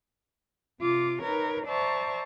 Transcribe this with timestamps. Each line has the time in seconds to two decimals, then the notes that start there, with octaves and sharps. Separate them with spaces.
0.80 C3 F4 D6
1.21 D#4 A#4 B4 C#5
1.66 C5 D5 E5 A5 A#5 C#6